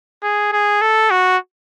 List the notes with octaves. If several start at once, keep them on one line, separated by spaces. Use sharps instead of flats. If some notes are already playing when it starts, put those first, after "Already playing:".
G#4
G#4
A4
F#4